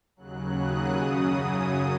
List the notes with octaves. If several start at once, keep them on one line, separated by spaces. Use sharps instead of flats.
D#2 C#3 F#3 F#6
D#6
F#2 C#3 F#3